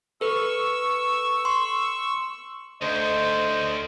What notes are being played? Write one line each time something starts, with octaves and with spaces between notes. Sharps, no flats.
A4 B4 C#6 E6
C6
D2 D3 C5 D#5